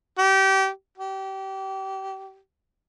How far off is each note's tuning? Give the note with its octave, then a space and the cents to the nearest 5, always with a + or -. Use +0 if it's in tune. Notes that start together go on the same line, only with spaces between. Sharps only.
G4 -25
G4 -30